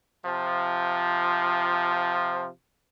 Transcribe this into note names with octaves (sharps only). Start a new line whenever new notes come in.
C3 F3